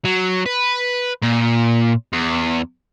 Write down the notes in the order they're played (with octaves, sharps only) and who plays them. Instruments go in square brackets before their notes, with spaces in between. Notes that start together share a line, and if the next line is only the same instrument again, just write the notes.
[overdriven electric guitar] F#3
B4
A#2
E2